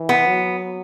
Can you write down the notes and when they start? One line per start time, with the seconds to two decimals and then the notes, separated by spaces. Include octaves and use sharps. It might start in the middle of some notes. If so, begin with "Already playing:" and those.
Already playing: E3
0.09 B3
0.26 F#3